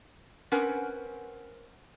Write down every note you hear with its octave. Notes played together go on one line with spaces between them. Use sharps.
C4 C#4 A#4 B4 F#5